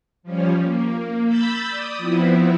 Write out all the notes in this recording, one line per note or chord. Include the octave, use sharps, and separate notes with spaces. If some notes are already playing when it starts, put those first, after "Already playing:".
F3 G3 C#4
A#3
B5 E6 G6 A6
D5 D#6
F3 B3 C4 E4